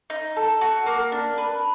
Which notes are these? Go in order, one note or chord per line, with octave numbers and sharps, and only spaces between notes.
D#4
A4
F#4
A#3
D4
B4